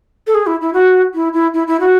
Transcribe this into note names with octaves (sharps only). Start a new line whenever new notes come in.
A4
G#4
E4
E4
F#4
E4
E4
E4
E4
F#4